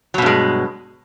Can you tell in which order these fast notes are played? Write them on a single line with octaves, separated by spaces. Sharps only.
F#3 B2 G2 G#3